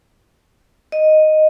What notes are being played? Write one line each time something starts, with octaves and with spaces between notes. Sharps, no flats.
D#5